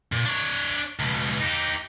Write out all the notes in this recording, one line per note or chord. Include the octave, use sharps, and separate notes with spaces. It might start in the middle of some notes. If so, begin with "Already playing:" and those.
A#2
D4 C#5
C#2 B2
D#4 G4